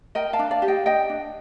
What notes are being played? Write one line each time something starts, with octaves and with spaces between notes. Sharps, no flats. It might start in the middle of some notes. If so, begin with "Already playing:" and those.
A#4 D#5 G5
F5 A5
D4
D5 F5
G4
D#5 G5
D4 D#5 G5
D4